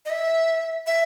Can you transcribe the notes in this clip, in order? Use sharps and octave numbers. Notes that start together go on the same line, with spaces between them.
D#5
E5
E5